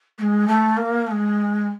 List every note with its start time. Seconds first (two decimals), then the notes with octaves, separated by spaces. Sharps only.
0.18 A3
0.22 G#3
0.48 A3
0.77 A#3
1.07 A3
1.11 G#3